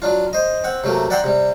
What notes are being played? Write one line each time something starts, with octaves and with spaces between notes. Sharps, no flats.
F#3 D4 F4
C5 D#5
C4 F#5
C3 F#3 A3 A#3
D5 E5 F#5 G5 A#5 C6
C3 G3